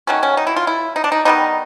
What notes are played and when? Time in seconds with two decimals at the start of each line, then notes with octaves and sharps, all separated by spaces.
0.07 D#3 F#3 A3 C#4
0.23 C#4
0.37 D#4
0.47 E4
0.56 F4
0.67 E4
0.96 D#4
1.04 D4
1.12 D#4
1.25 D#3 G3 B3 D#4